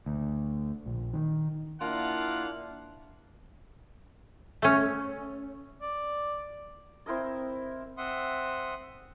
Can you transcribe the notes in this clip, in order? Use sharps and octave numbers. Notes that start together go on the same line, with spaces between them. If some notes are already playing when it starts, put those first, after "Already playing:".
D2
A#1
D#3
A#3 D4 E4 F4 F5 F#5
A3 C#4
D5
C4 E4 A#4 D#5
C4 E5 F#5 C6 D#6